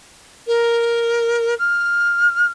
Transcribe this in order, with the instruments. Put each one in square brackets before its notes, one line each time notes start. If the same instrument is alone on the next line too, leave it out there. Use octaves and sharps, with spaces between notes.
[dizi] A#4
F6